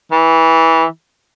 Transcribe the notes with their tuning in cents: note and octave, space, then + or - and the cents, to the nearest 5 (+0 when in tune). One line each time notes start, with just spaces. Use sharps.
E3 -15